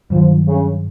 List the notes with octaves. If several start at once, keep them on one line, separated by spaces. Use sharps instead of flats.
G2 D#3 F3 F#3
C#3